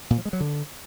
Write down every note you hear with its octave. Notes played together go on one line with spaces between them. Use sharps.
A#2
F3
G#3
F#3
D3